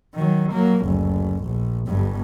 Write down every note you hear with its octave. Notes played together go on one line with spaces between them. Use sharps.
D#3 F#3
F#3 A#3
F#1 D2
A#1
G1 G2